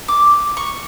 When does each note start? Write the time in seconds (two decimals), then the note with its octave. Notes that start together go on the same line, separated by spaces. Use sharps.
0.08 D6
0.57 C#6